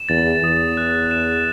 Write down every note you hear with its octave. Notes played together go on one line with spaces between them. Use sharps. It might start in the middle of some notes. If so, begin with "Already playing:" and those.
Already playing: E7
E2 A6
E2 D#6
F#6
E7